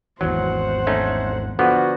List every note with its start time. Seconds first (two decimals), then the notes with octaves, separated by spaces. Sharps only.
0.21 G#1 E2 E3 F#3 C5 F#5
0.87 A3 C#4 D#4
1.59 D3 F3 B3 F#4